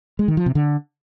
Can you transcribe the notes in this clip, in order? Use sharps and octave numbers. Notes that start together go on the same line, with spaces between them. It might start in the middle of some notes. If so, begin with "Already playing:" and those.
G#3
D#3
F3
C3
D3